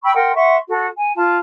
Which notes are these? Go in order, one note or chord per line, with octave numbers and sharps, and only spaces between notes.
G5 B5 C#6 E6
A#4 F#5 G5 C6
E5 F#5 C6 C#6
F#4 A4
G#5
F4 A5